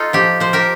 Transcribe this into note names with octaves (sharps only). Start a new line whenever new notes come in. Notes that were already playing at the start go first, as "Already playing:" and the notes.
Already playing: D#4 F4 A4
F3 G4
F3 C5
G4 A#4